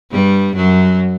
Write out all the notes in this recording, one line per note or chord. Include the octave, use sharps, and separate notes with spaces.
G2 G3
F#2 F#3